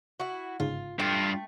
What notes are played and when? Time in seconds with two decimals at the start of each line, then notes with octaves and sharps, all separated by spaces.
0.20 E4 F#4
0.60 G1 G#2 C#3 F4
0.99 G2 A3 F4 G5